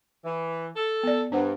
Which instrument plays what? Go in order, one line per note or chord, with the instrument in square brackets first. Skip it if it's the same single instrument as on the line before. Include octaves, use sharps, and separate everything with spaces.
[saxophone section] E3
A4
[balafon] B3 D5
[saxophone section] G2 [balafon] D4 C5 F#5